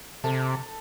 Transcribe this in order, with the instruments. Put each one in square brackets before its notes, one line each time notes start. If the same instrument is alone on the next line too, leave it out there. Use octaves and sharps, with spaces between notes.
[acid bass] C3 [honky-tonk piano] A4 A5